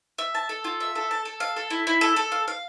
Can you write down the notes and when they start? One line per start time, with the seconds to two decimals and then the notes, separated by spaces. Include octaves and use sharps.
0.19 E5
0.35 A5
0.49 A4
0.64 F4
0.80 E5
0.96 A4
1.11 A5
1.25 A4
1.40 F5
1.56 A4
1.70 E4
1.87 E4
2.01 A4
2.16 A4
2.32 F5
2.48 F5